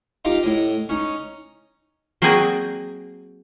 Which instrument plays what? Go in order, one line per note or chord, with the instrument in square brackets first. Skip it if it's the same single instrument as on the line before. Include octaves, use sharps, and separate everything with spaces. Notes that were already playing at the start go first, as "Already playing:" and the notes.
[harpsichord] D#4 F4 G4 A#5
A2 D#5
C#4 D#4
[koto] F#3 A#3 C4 F#4 G#4 D5